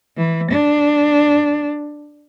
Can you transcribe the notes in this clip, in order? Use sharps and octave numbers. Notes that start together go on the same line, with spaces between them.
E3
D4